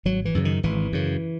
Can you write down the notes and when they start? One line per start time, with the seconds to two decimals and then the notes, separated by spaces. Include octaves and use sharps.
0.05 G#1 F#3
0.25 E3
0.35 F#2 C#3
0.45 D#3
0.63 G#1 E3
0.93 F#2 C#3